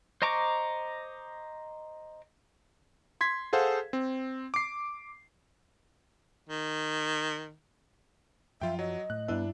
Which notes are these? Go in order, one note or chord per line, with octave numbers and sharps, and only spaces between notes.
C5 D#5 A#5 C#6 D6
C6 G#6 B6
G#4 A4 C5 F5 F#5
C4
D6 C7
D#3
F#2 F3 F4 E5 G5
F#3 D#5
A2 F#6
G2 B3 D4 E4 E5